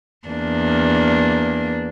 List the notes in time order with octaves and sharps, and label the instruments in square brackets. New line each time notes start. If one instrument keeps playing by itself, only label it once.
[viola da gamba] E2 A#3 D4